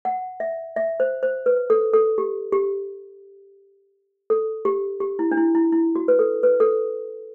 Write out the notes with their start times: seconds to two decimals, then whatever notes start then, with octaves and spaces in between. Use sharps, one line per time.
0.05 F#5
0.40 E5
0.76 E5
1.00 C5
1.23 C5
1.46 B4
1.70 A4
1.94 A4
2.18 G4
2.53 G4
4.30 A4
4.65 G4
5.01 G4
5.19 E4
5.31 D4
5.37 E4
5.55 E4
5.72 E4
5.96 F#4
6.08 B4
6.19 A4
6.43 B4
6.60 A4